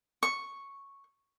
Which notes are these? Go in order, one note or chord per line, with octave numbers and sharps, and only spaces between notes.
C#6